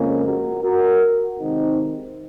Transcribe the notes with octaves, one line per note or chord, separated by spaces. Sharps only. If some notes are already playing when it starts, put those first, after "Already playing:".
Already playing: F2 C#3 F3 G#3 A#3 C#4
F#4 A#4
F#4 A#4
C3 D#3 G#3 C4 D#4